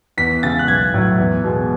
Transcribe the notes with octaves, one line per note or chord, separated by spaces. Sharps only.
E2 B6
C#3 G#3 A6
F#6
B1 G#6
A2 F#3
E2
B2 G#3